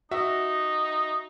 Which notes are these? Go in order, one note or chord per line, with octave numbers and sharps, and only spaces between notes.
D#4 F#4 E5